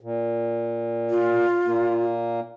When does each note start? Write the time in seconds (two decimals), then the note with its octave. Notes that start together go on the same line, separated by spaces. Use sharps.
0.01 A#2
1.10 F4
1.66 A#2 A#3